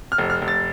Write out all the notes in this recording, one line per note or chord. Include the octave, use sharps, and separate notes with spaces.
F6
F1
F6
F1
A6